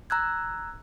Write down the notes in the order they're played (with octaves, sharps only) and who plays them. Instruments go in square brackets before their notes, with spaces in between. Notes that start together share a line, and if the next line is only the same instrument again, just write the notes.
[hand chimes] A#5 E6 F#6 G#6